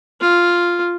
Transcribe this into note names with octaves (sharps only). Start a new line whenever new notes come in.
F4